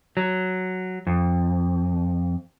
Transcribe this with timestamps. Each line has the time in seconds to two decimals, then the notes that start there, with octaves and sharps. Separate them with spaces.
0.17 F#3
1.07 F2